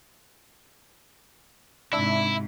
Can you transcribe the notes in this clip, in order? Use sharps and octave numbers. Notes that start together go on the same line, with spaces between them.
G#2 C3 D4 E4 E5